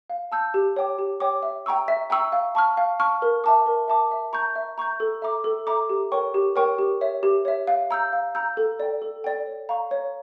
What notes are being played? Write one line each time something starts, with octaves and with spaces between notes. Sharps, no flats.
F5
A5 E6 G6
G4
C#5 G5 D6
G4
C#5 G5 D6
E5
G5 A#5 C#6 E6
E5
G5 A#5 C#6 E6
F5
A5 C#6 F6
F5
A5 C#6 F6
A#4
E5 A5 D6
A#4
E5 A5 D6
E5
A#5 C#6 G6
E5
A#5 C#6 G6
A4
E5 A#5 D6
A4
E5 A#5 D6
G4
A#4 C#5 G5 C#6
G4
A#4 C#5 G5 C#6
G4
C#5 E5
G4
C#5 E5
F5
A#5 E6 G6
F5
A#5 E6 G6
A4
D5 G5
A4
D5 G5
C#5
F5 A#5 C#6
C#5